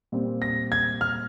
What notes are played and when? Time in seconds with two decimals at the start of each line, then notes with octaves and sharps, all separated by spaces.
0.12 A#2 G3 C4
0.42 A#6
0.72 G#6
1.01 F6